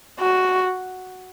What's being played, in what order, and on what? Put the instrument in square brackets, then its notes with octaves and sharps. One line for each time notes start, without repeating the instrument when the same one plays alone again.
[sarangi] F#4